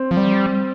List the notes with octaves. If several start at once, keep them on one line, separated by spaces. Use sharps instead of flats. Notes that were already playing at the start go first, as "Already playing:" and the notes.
Already playing: C4
F3
G3